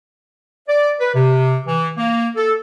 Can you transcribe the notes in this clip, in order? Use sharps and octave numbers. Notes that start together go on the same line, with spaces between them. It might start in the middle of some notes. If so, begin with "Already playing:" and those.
D5
B4
C3
E3
A#3
A4